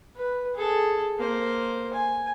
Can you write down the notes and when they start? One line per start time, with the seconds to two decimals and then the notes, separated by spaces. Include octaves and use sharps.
0.16 B4
0.55 G#4 A4
1.19 A#3 C5
1.93 G#5